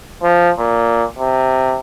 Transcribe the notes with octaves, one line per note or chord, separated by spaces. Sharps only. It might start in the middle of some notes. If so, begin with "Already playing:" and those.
F3
A#2
C3